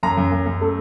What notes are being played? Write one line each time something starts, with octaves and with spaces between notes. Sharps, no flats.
F#2 A#5
F#2
F#2
F#2
A3